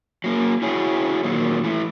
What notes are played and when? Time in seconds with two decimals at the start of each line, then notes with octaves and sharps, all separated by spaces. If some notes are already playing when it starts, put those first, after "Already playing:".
0.24 F#3 A#3
0.62 E4 F#4 G#4 C#5
1.23 A#2 D#3 F#3 A#3
1.64 E3 A3